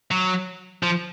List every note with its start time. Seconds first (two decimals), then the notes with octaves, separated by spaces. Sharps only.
0.11 F#3
0.83 F3